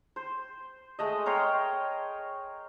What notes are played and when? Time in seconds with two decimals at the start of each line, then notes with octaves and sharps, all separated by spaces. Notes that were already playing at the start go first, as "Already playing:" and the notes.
0.16 C5
0.99 G#3 A3 D#5
1.26 A#4 C#5 G5 C6